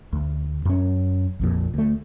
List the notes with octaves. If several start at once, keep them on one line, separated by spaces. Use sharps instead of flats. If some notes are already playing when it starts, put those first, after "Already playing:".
D2
F#2 C#4
A#1 F2 A#2
D2 A3